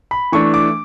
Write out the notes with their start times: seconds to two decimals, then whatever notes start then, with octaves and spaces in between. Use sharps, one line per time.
0.11 B5
0.32 E3 A3 D4 C#6
0.54 D6